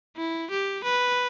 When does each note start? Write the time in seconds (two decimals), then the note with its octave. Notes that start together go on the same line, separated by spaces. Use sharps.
0.16 E4
0.50 G4
0.84 B4